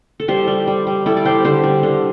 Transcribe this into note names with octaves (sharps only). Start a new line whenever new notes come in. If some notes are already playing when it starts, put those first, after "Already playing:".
A4
G3 G4 C5
G3
G3
G3
G3 E4 A4
D5
G3 G4 C5
D3 G4 C5
G3
D3